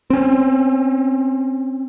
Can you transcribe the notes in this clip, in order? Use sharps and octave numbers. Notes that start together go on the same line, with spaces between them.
C4 C#4